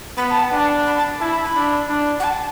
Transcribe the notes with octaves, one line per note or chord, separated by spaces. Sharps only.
B3 B5
A5
F#5
D4
A5
B5
A5
E4 A5
B5
B5
D4
D4
F#5
A5